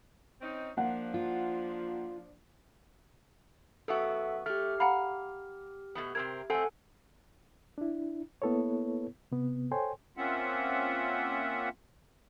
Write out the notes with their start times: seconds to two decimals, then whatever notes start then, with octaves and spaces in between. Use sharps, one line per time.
0.40 C4 C#4 D#4
0.77 F3 A#3 D4 F#5
1.14 F4
3.88 F#2 B3 F#4 A4 E5
4.46 A3 G4 F6
4.80 F5 F#5 A#5 B5
5.95 B2 A3 B3
6.15 C3 C4 A#4 G#6
6.50 A3 C4 A4 F#5 G#5
7.78 D4 E4
8.42 A#3 B3 E4 A4 B4 C#5
9.32 C3 B3
9.72 A4 C5 C#5 G5 G#5 C6
10.17 A#3 C4 C#4 F4 E5 F#5